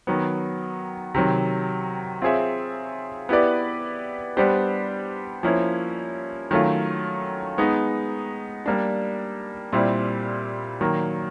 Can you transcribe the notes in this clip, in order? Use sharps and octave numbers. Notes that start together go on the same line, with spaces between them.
D#3 F#3 B3
C3 D#3 F#3
C4 F4 G#4 C#5 E5
B3 E4 G4 B4 D5
G3 B3 D4 G4 C5
F3 A#3 C#4 E4
D#3 F#3 A3 C#4 F4
G#3 B3 D#4
G3 A#3 D4
A#2 G3 C4 E4
D#3 F#3 A#3